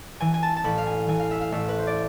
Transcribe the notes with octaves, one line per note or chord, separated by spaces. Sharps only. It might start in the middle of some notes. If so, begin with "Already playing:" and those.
E3 G#5
G#5
A5
A5
A1 B5
F5
G#5
E3 G#5
F5
E5
F5
A1 E5
B4
C5
D5